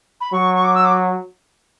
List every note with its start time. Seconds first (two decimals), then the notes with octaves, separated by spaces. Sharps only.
0.21 B5
0.33 F#3 C#6
0.54 C#6
0.64 D6
0.75 E6
0.85 D6